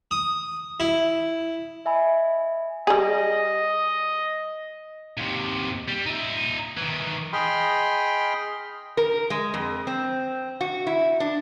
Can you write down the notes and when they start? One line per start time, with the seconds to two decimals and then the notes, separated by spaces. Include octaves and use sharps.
0.11 D#6
0.80 E4
1.85 D#5 E5 G#5 B5
2.87 G3 G#4 D#5
5.17 D#2 C3
5.88 G3
6.06 D#4 E5
6.77 D#3 E3
7.33 G#4 D#5 G5 B5 C6 F6
8.97 A#4
9.30 G#3
9.54 F2
9.87 C4
10.61 F#4
10.87 E4
11.20 D4